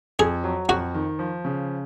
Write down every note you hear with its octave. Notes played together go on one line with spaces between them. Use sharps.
F2 G#4
F#3
F2 F#4
D#3
F3
C#3